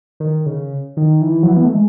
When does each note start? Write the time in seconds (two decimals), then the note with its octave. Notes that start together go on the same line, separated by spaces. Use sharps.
0.20 D#3
0.46 C#3
0.97 D#3
1.22 E3
1.43 F#3
1.48 E3
1.57 B3
1.64 A3
1.73 G#3